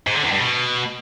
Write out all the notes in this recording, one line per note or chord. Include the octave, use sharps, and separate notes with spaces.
G#2
D3
E2
G2
B2